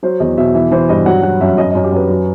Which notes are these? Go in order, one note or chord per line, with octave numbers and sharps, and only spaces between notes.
F#3 C5
E2 D#5
B2 E5
E3 E5
E3 C5
G2 D#5
F#3 F#5
F#3 F#5
F#2 E5
F#2 D#5
D#5
F#2
G4
F#2 B4
F#3